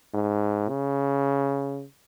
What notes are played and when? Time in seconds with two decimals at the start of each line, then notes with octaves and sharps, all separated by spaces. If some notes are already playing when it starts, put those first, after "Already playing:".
0.14 G#2
0.69 C#3